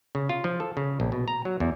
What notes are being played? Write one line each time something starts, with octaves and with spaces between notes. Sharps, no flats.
C#3
F4
F3
A4
C#3
A#1
B2
A#5
F#3
E2